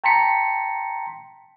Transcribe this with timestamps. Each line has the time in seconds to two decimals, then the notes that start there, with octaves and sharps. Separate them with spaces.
0.04 G5 A5 A#5 C6 B6 C#7